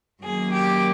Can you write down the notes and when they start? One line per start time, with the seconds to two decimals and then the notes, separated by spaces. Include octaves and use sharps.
0.22 F#2 D#3 F#3 A#3 G#4
0.51 G4